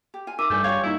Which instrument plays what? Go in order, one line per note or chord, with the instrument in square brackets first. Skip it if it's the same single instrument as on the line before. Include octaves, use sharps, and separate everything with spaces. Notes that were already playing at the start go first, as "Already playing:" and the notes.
[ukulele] G4
F4 G#5
[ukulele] D#4 F4 [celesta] A#4 D6 D#7 [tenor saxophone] E5
[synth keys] G2 G3 [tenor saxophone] A3 [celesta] G#5 D6 G6
[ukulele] F4 G4 F5 [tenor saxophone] C#5
[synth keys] G3 A#3 D#4 [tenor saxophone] E4